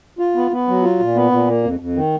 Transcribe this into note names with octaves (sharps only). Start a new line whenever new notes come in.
F4
B3
B3
F#3
F4
A#2
B3
A#2
A#3
F2
F2
D#3